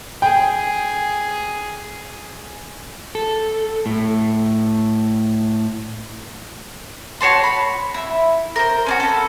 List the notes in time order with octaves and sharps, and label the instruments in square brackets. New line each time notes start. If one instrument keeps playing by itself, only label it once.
[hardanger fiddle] G#4 [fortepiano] G5
[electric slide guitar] A4
A2
[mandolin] F#4 C#5 A5 C6
B5
E4
A#4 C5
C#4 D4 F#4
A4 B4